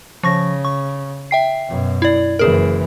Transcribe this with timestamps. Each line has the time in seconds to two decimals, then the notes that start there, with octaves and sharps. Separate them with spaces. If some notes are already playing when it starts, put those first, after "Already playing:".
0.23 C#3 F3 C#6 A#6
0.65 C#6
1.31 E5 G5 C7
1.68 F#2 B2
2.02 E4 D5
2.39 F#1 E3 G#4 A#4